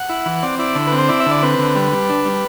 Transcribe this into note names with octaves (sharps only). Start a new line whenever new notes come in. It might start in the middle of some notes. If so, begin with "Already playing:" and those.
Already playing: F#5
E4
E3
C4 D5
E4 D5
D3
C4 B4
C5
E4 D5
E5
D3
D5
C4 B4
D3
G3
G3
D4
G3